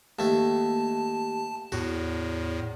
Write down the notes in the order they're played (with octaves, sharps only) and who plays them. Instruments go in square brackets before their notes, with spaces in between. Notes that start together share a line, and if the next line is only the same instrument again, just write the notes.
[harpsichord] D#2 A3 [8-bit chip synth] A5
[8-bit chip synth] E2 A2 [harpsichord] F#4